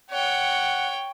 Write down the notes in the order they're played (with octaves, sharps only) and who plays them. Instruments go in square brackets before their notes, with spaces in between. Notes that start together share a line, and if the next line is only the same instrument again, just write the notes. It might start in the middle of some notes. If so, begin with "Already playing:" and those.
[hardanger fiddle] C#5 G5 [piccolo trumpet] F#5